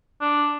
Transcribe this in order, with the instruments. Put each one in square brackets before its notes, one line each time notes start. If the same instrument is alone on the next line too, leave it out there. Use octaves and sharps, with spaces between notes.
[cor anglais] D4